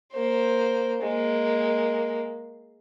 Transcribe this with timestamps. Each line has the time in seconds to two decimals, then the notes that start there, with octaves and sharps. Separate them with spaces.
0.13 A#3 C5
1.02 G#3 A#3